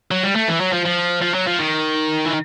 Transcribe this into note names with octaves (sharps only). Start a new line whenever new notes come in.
F#3
G3
A3
E3
F#3
F3
F3
F3
F#3
F3
D#3
E3